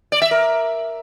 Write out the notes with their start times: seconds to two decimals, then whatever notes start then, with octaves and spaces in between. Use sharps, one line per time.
0.12 D5
0.22 E5
0.31 A#4